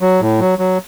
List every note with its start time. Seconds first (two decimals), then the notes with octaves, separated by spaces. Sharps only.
0.01 F#3
0.21 A2
0.40 F#3
0.59 F#3